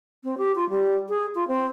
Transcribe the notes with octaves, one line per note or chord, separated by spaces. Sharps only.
C4
G4
F4
G3
G#4
F4
C4